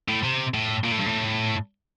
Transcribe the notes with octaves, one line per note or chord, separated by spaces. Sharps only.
A2
C3
A2
A#2
A2
G2
A2